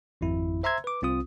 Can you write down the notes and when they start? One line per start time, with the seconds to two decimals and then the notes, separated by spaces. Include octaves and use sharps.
0.21 G#1 F2 E4
0.63 C5 E5 A#5 C6 E6 G#6
0.84 B4 D6
1.02 C2 C4 F4 D#6